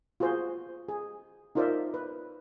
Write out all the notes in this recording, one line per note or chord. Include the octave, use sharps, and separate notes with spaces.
F4 F#4 G#4 C5
G#4
D#4 F4 A#4 C5 D5 E5
B4